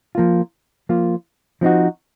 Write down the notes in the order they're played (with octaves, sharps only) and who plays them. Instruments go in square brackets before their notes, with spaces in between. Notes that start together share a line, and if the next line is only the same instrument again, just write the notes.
[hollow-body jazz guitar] F3 A#3 F4
F3 A#3 F4
F3 C4 D#4 F#4